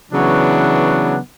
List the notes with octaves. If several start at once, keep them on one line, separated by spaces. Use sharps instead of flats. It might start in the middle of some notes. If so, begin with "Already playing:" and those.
C#3 E3 F#3 B3 D4